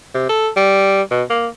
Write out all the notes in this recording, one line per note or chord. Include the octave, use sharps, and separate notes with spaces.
C3
A4
G3
B2
A#3